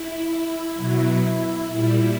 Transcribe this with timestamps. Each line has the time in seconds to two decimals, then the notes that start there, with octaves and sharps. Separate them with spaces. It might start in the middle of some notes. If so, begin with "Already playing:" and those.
Already playing: E4
0.74 B2 F#3
1.68 A#2 G3